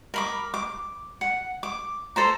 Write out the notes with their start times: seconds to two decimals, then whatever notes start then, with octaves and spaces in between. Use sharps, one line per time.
0.14 A#4 B5 D6
0.54 D6
1.21 F#5
1.63 D6
2.16 A4 C5 A#5